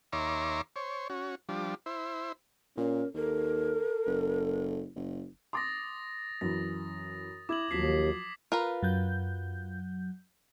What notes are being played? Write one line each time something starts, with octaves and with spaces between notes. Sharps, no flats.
D#2 C#5 E5 A#5 C6 D6
C5 C#5
C#4 F#4
F3 G3 D4
E4 C5
A#2 C#4 A#4
D#2 A4 A#4
F#1
F#1
C6 D6 D#6 A6 A#6
F#2 E3 A#6
E4 D6 G#6 F#7
D#2 F3 F#3 D6 B6 C7
F4 A#4 B4
F#2 F#3 G6